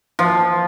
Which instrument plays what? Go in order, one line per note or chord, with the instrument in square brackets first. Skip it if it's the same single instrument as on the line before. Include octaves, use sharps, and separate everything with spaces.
[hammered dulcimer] F3